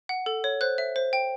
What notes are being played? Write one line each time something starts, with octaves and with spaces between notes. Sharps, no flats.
F#5
A4
C#5
C5 F#6
E5
C5
G5